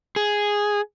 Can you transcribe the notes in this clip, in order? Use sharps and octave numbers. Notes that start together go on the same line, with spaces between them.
G#4